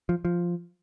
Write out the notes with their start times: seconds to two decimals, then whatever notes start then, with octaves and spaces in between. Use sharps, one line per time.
0.09 F3
0.25 F3